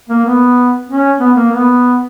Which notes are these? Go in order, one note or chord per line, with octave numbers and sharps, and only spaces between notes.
A#3
B3
C#4
B3
A#3
B3